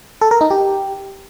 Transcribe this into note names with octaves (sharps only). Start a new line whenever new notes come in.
A4
A#4
D#4
G4